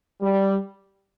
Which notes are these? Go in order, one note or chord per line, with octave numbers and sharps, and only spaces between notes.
G3